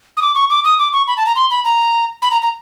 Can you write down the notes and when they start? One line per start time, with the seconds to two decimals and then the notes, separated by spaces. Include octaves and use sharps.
0.17 D#6
0.22 D6
0.35 C#6
0.50 D6
0.64 D#6
0.79 D6
0.93 C#6
1.07 B5
1.17 A5
1.26 A#5
1.36 C6
1.50 B5
1.65 A#5
2.22 B5
2.31 A#5
2.42 A#5